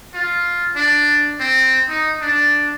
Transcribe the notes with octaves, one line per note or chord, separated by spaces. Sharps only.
F4
D4
C4
D#4
D4